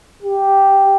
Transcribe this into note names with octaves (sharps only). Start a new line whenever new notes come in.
G4